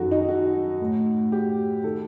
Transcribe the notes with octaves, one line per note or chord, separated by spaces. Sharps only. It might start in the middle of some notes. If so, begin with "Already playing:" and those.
Already playing: F#2 D#3 F#4 A4
D#4
F#4
A2
G4
D#3 A4